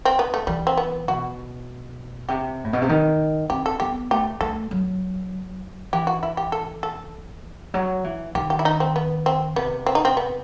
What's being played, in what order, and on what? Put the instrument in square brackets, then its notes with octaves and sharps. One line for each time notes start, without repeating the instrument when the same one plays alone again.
[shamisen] C4
B3
A3
[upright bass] E3 [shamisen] G3
[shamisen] C4
B3
[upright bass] B2 [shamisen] F#4
[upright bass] C3 [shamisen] G4
[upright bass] A2
B2
C3
D#3
[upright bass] C4 [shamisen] G4
[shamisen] A4
[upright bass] B3 [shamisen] G4
[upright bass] A3 [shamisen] G4
[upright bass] A3 [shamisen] A4
[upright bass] F#3
[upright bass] E3 [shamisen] G4
[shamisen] F#4
E4
G4
A4
A4
[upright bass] F#3
E3
[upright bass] D#3 [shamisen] G4
[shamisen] G4
E4
D#4
C4
B3
C4
[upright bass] C3 [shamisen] B3
[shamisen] C4
D#4
C4
B3